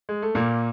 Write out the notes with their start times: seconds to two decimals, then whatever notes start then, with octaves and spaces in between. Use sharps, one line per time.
0.09 G#3
0.22 A3
0.35 A#2 A#3